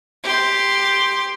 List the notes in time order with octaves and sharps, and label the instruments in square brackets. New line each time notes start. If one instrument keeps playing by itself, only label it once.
[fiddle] G4 C6